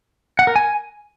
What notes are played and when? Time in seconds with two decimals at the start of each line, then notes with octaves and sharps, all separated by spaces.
0.39 F#5
0.47 A#4
0.56 G#5